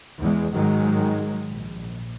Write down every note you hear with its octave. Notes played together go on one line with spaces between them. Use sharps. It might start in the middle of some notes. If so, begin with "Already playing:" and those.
E2 G#3
G#2 D#3 F#3 G#3
A#1